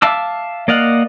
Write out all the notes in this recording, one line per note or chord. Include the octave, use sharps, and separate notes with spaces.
E5 F5 A5 D6 E6
A#3 D5 D#5 F5 F#5